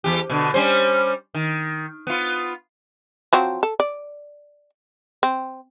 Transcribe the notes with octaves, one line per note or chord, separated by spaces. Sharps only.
E2 G4
B2 D3
G3 C#4 C5
D#3
B3 F4
F3 F#3 C4
A4
D5
C4